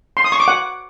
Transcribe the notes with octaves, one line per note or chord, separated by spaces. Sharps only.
C6
D#6
C#6
D6
F#5